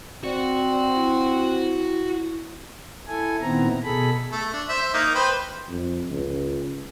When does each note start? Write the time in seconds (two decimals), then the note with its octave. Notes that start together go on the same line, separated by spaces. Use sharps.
0.24 C4 F#4 D5
0.95 E4
3.08 E4 A4 G#5
3.41 A#2 D#3 B3 C4 E4 A#5
3.84 B2 G#4 A4 B5
4.32 A3 A4
4.53 D4
4.69 C5 E5
4.94 A#3 D#4
5.15 B4 C5 G5
5.69 F2
6.10 C#2